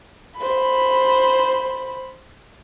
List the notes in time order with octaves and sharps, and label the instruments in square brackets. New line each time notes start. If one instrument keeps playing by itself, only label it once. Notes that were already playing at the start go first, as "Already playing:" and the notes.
[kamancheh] C5 B5